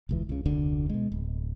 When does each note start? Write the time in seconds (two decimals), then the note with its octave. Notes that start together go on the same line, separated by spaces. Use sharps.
0.09 E1 C#2 E3
0.29 C#2 C#3
0.45 F1 D2 D3
0.89 B2 G#3
1.12 D1